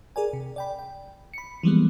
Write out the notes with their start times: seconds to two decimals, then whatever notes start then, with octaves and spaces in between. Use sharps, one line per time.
0.16 G#4 A#4 D5 G#5
0.33 C3
0.56 D5 G5 B5
0.79 G5
1.34 B5 C#7
1.63 E3 F3 G3 G#3 A#3 B3